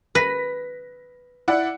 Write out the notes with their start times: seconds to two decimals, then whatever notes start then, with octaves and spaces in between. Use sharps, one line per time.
0.15 B4 A#6 B6
1.48 E4 D5 F#5